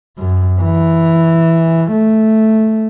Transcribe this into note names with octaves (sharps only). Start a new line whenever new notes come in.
F#2
E3
A3